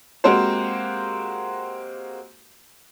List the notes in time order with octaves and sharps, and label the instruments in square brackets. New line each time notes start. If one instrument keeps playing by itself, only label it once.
[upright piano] G#3 A#3 C4 F#4 G4 C5